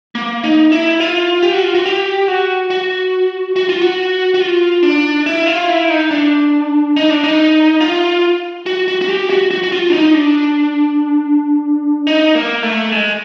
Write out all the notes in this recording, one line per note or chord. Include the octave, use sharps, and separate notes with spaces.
A#3
D#4
E4
F4
G4
F#4
F4
F#4
G4
F#4
F#4
F#4
F4
F#4
F#4
F4
D4
E4
F4
E4
D#4
D4
D#4
D4
D#4
F4
F#4
F#4
F#4
G4
F#4
F#4
F#4
F4
D4
D#4
D4
D#4
A#3
A3
G#3